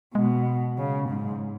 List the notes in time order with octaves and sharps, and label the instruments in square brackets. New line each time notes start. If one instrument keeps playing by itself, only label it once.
[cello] B2 [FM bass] G#3
[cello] C#3 [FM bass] F#3
[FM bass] G#3
[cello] G#2 [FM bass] F#3